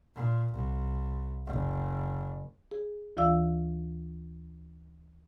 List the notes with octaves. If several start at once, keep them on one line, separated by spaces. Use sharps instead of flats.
A#2
C2
F#1
G#4
D2 E3 F4 D5 F5 E6